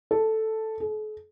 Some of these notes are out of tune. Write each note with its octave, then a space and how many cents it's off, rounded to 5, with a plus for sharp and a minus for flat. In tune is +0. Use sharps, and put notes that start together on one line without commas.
A4 +0
A4 -45